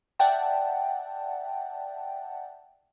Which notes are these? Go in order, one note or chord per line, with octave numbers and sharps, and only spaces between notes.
D5 E5 F#5 G5 A5